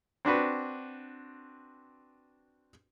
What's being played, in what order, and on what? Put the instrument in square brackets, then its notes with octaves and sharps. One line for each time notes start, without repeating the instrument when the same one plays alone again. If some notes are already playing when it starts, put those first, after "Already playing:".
[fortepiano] C4 D4 F#4 B4